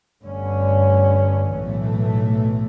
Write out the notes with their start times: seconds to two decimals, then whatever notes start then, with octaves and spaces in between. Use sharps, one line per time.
0.21 G1 G2 D3 A3 C#4
1.53 B1 A2 E3 A3